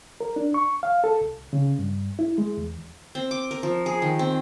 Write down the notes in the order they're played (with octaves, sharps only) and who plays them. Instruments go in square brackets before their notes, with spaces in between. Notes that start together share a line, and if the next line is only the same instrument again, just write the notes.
[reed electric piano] A#4
D4
C#6
F5
A4
C2
C#3
G2
E4
G#3
E2
[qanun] C4
D6
A#4
F3
G#4
D#3
C4